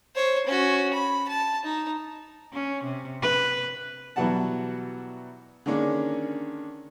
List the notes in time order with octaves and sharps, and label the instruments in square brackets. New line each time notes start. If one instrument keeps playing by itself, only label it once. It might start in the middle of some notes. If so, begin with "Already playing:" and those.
[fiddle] C5 C#5
C#4 F#4
B5
A5
D#4
[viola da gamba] C#4
C3
B4
[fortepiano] B2 E3 F#3 G3 F#5 A5
D3 D#3 G#3 A#3 C#4 D4